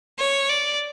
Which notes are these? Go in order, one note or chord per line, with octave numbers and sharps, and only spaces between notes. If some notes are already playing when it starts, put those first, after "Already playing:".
C#5
D5